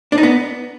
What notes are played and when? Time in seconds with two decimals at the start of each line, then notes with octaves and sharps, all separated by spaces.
0.12 D4
0.18 D#4
0.23 B3